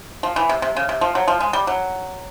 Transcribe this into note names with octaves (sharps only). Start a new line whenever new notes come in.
F3
E3
C3
C3
C#3
C3
F3
F#3
F3
G#3
G3
F#3